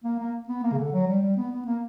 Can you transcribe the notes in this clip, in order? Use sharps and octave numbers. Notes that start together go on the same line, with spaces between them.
A#3
A#3
B3
A#3
C#3
D3
F#3
G3
G3
B3
B3
A#3